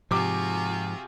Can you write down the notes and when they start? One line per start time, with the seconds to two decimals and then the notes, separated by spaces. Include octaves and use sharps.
0.11 G#2 C3 F3 F4 F#4 G#4 D6